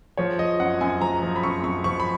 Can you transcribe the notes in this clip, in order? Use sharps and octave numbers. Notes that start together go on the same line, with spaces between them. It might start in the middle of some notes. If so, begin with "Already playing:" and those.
F3 C#5
F3 D#5
F#2 F#5
F#2 G#5
F3 A#5
F3
B5
F#2 C#6
F#2 C#6
F3 C#6
B5